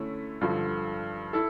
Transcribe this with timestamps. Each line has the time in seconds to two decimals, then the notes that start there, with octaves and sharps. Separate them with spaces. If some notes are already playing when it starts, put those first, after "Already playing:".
Already playing: D3 A3 C#4 E4
0.41 G2 D3 F3
1.33 E4 A4